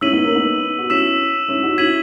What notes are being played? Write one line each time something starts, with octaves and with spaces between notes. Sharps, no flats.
C#4 E4 E6 B6 D#7 F#7
B3 D#4
A#3 C#4
B3 D#4
F#4
C#4 E4 E6 B6 E7
C#4 E4
D#4 F#4
C#4 E4 G#6 B6 D#7 F#7